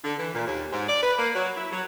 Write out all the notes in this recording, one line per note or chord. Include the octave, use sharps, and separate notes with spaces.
D3
E3
A#2
D#2
G#2
D5
B4
A#3
F#3
E4
F#3